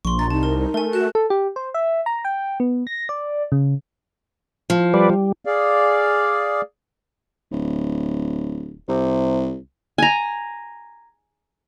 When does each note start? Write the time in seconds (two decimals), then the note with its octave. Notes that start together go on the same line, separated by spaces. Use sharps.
0.05 A#1 C6 C#6
0.19 A#5 A6
0.30 C2 D#4 A5
0.43 A#4
0.74 A3 A#4 G#5
0.93 F#4 F#6 E7
1.15 A4
1.30 G4
1.56 C5
1.74 E5
2.06 A#5
2.25 G5
2.60 B3
2.87 A#6
3.09 D5
3.52 C#3
4.70 F3
4.94 G3 B4 D5
5.10 G3
5.45 G#4 D5 F5
7.52 D1
8.88 C2 C3
9.98 G#5 A#5